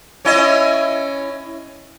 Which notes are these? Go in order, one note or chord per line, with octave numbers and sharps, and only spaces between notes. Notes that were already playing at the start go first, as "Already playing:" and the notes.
C#4 E4 D#5